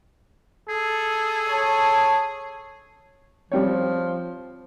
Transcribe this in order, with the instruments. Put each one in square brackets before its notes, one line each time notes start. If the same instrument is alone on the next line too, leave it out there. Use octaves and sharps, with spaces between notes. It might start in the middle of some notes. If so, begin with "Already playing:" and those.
[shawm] G#4 [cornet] A4
[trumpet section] C#5 A5
[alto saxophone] F3 [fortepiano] G3 C4 C#5